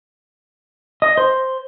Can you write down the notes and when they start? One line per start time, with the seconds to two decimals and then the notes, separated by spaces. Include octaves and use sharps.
1.02 D#5
1.17 C5